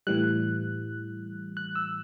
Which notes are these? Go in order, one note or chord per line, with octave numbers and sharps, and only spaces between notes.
A2 E3 G3 F#6
F#6
E6